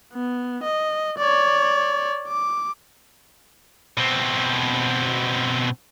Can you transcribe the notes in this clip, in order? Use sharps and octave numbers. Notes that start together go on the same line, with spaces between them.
B3
D#5
C#5 D5
D6
B2 C4